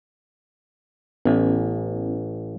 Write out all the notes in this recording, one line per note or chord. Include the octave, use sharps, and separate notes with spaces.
A1 B3 C#4 E4